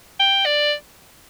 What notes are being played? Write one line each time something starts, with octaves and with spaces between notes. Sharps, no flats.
G5
D5